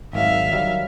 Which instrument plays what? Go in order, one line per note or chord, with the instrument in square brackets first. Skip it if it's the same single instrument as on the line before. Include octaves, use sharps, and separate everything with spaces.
[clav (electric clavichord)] G#1 D#3 F#3 [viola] E5 F5
[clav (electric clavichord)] D#3 F#3 G3